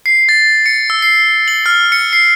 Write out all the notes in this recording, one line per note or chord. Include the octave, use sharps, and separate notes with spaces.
C7
A6
C#7
E6
C7
F#7
F6
C#7
C7